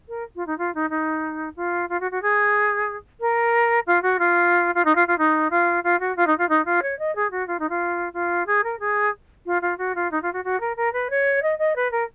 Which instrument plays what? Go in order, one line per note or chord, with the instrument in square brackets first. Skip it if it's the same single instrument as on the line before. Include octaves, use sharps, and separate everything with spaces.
[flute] A#4
F4
D#4
F4
D#4
D#4
F4
F4
F#4
F#4
G#4
A#4
F4
F#4
F4
F4
D#4
F4
F4
D#4
F4
F4
F#4
F4
D#4
F4
D#4
F4
C#5
D#5
G#4
F#4
F4
D#4
F4
F4
G#4
A#4
G#4
F4
F4
F#4
F4
D#4
F4
F#4
F#4
A#4
A#4
B4
C#5
D#5
D#5
B4
A#4